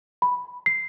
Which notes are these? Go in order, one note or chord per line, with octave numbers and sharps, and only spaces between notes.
B5
C7